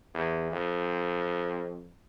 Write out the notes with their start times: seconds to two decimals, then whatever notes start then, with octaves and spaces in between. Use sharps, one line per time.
0.14 E2
0.52 F2